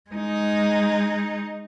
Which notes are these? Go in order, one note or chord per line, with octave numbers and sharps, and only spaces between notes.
G#3 D#4